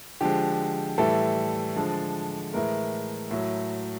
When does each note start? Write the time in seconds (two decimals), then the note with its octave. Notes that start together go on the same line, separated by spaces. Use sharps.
0.21 D3 F3 G#3 G4
0.98 A2 E3 G3 A4
1.76 D3 F3 G#3
2.54 A2 E3 G#3 A#4
3.31 A2 F#3